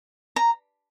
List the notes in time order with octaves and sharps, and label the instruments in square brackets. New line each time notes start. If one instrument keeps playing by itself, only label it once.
[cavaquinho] A#5